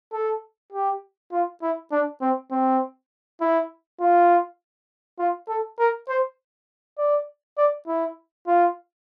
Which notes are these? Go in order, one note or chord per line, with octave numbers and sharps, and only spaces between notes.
A4
G4
F4
E4
D4
C4
C4
E4
F4
F4
A4
A#4
C5
D5
D5
E4
F4